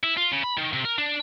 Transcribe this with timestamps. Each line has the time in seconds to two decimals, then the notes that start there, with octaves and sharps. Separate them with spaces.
0.03 E4
0.17 F4
0.32 C#3
0.43 B5
0.57 D#3
0.73 C3
0.85 A#4
0.98 D4